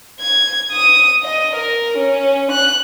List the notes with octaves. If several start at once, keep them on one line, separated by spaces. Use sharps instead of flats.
G#6
D#6
D#5
A#4
C#4
F#6